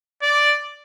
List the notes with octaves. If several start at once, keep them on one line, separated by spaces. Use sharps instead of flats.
D5